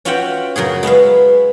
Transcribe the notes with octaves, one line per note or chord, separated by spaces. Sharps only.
C#4 F4 F#4 E5 F#5 G5
F#2 C#3 F#4 G#4
G#3 B3 E5 F5